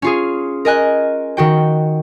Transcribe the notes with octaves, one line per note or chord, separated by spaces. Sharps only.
C#4 F4 G#4
A#4 D#5 G#5 F#6
D#3 F#4 G5